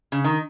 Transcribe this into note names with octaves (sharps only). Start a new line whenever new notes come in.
C#3
D#3